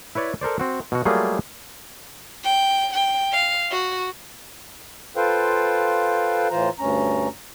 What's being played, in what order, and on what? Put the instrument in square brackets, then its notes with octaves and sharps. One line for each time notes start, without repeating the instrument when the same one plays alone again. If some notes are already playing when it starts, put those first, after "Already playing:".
[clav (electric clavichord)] E4 B4 C#5 D5
A4 A#4 C5 D5
C4 F#4
B2 F#4
F#3 G3 A3 A#3 F4 G#4
[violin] G5
G5
F5
F#4
[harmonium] F4 A4 B4 C5 F5 G5
A2 E3 F4 C5 A#5
D2 G2 C#4 A#5